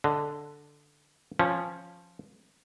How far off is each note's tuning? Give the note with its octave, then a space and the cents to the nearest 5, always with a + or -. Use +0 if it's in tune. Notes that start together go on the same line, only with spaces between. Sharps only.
D3 +0 D#5 +0
F3 +0 C#4 -15